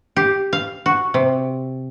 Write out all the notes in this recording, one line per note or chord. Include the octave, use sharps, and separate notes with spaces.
G4
F5
F#4
C3